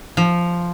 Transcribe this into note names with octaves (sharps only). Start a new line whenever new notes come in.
F3